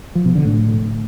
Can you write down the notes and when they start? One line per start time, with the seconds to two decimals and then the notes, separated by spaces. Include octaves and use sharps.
0.15 F3
0.25 B2
0.35 D3
0.45 A2